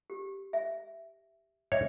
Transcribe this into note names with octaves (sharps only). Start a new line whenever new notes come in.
G4
E5
C#5 D#5 E5